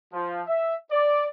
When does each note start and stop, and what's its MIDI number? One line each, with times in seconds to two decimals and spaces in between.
0.13 0.41 53
0.47 0.75 76
0.92 1.27 74